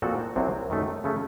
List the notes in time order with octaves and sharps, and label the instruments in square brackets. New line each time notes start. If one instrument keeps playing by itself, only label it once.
[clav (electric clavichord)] A#2 F3 C4 F#4 A4
C2 C3 F#3 C4
F#2 D#3 A3
C#3 A3 C#4